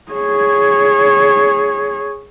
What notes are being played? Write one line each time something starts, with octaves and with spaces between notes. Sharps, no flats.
G#4 C#5